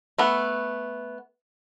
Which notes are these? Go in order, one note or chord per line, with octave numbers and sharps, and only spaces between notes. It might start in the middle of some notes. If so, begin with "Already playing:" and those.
A3 B3